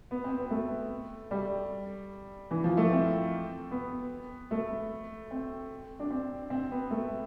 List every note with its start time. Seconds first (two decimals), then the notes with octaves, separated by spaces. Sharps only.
0.11 B3
0.24 C4
0.38 B3
0.50 A3
1.31 G3
2.51 E3
2.64 F3
2.77 A3
2.91 C4
3.71 B3
4.51 A3
5.31 C4
5.99 D4
6.10 C4
6.50 C4
6.71 B3
6.91 A3